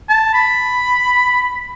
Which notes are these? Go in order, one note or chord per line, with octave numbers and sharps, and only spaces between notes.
A5
B5